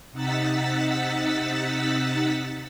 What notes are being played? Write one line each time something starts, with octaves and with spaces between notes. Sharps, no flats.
C3 D#4 F#5 E6 A6 B6